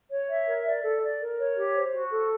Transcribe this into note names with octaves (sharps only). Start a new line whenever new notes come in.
C#5
E5
A#4
D5
A4
D5
A#4
C#5
G4
C5
F#4
A4